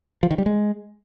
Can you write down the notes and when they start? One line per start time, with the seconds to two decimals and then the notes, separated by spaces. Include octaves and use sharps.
0.23 F3
0.31 D#3
0.38 G3
0.46 G#3